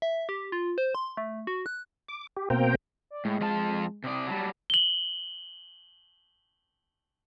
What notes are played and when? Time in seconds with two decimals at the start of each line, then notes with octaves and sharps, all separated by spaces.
0.02 E5
0.29 G4
0.52 F4
0.78 C5
0.95 C6
1.17 A3
1.47 F#4
1.66 F#6
2.09 D6
2.36 G4
2.50 B2 A#3 C4 C5 G5 A#5
3.10 D5
3.25 A2 G#3
3.41 F2 F4 A5
4.04 C3 D5 D#6
4.27 F#3 G3 A5
4.70 F#7 G7